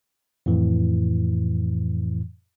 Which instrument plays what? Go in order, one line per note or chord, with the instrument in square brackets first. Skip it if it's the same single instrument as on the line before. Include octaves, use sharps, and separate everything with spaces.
[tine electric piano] F2 A2 E3